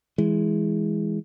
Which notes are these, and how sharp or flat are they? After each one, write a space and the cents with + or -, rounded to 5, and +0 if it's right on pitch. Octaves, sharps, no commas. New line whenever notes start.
E3 +0 G#3 +0